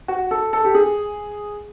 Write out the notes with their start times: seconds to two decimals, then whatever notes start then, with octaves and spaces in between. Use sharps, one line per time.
0.08 F#4
0.31 A4
0.53 A4
0.65 G4
0.75 G#4